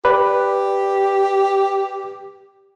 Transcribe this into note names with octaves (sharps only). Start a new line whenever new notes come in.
G4 B4 D5